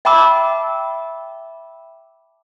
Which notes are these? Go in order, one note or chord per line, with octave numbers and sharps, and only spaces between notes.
E5 G5 A5 B5 D6 E6